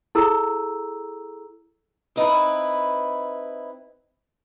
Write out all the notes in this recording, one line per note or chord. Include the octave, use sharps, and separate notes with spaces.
E4 G#4 A4 A#5 E6
C4 D#4 E4 B4